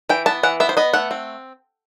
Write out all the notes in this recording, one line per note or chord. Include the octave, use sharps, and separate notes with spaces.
E3 G5
B3 A5
E3 F#5
B3 E5
C5
B3 D#5
A3 F#5
C4